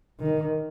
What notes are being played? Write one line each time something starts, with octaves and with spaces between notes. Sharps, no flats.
D#3